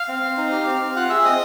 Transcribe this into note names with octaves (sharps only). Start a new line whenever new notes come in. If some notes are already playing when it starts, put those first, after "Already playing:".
Already playing: F5 F6
C4
C4
D#4
G4
C4
C4
F4 F#5 F#6
G#4 E5 E6
C4 D#5 D#6